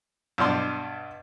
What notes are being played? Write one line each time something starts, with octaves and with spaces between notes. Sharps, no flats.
G2 B2 D4 C6